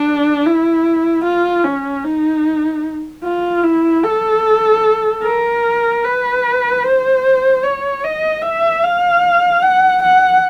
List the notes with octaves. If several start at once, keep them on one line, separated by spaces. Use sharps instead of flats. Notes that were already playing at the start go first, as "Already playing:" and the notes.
Already playing: D4
E4
F4
C#4
D#4
F4
E4
A4
A#4
B4
C5
C#5
D#5
E5
F5
F#5
F#5